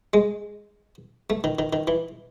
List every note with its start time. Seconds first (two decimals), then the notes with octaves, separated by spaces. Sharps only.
0.14 G#3
1.30 A3
1.44 D#3
1.59 D#3
1.73 D#3
1.87 E3